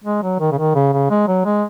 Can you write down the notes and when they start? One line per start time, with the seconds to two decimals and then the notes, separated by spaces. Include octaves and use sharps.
0.04 G#3
0.23 F#3
0.40 D#3
0.52 C#3
0.58 D#3
0.75 C#3
0.93 C#3
1.10 G#3
1.28 F#3
1.45 G#3